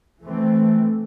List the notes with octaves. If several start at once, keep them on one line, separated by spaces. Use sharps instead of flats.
E3 A3 C4